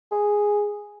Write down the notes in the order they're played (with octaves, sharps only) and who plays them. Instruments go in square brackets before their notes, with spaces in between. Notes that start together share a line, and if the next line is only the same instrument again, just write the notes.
[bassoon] G#4